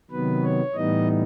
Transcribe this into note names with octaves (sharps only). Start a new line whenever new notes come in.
C3 D#3 F#3 B3 B4
C#5
A2 E3 G3 B3 D#4 D#5